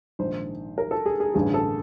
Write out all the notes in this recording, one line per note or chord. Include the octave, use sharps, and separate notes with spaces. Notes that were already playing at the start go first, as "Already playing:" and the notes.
A#1 G#2 D#3 C5
A#4
A4
G#4
G#4
A1 G2 D3 G#4
A4